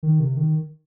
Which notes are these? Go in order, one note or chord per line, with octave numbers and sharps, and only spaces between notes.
D#3
C3
D#3